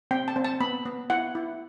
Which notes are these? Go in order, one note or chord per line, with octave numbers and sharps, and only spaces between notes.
C4 G5
A5
C4
A5
B3 B5
B3
E4 F#5
E4